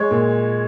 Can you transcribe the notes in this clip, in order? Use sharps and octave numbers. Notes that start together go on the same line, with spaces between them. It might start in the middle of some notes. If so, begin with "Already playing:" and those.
Already playing: G#3 C#5
A#2